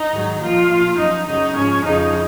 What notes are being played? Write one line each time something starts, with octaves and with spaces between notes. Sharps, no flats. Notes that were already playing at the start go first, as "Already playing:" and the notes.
Already playing: D#4
G#2 D#3 F#3
A#2 F3 F4
A#2 F3
F#2 F3 D#4
F#2 C#3 F#3 D#4
G#2 F3 C#4
F2 C#3 F3 D#4